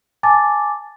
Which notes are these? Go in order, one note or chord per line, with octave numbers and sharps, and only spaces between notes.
G#5 A5 D6 A6